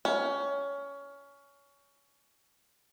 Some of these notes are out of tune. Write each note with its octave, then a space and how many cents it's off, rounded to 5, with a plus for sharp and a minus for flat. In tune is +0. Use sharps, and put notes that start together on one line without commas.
C#4 +20